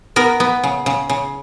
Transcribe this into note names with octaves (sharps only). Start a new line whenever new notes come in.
B3 A#4
B3
C#3
C#3
C#3